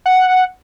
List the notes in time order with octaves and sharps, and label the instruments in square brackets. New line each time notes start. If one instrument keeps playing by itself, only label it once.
[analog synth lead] F#5